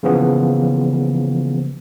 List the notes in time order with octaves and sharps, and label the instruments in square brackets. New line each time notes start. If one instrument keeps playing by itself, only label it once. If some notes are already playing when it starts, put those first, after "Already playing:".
[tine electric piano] C#3 E3 F3 A#3 B3